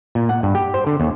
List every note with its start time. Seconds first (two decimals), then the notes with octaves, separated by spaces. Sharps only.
0.15 A#2
0.29 F#5
0.43 G2
0.55 G4
0.74 C5
0.87 D3
1.00 D#2